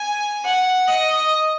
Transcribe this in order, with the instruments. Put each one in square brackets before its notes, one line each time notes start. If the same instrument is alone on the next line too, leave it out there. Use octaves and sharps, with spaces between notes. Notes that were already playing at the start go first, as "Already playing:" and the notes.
Already playing: [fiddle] G#5
F#5
D#5